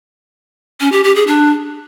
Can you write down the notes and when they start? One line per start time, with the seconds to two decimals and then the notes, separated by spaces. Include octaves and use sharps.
0.80 C#4
0.92 G4
1.04 G4
1.15 G#4
1.27 D4